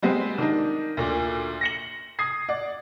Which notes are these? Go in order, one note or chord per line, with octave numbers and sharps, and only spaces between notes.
G3 G#3 B3 C4
D#3 D4 D#4
D2 A#2
A#6 C#7 F#7
D#6 G#6 C7
D5 F#5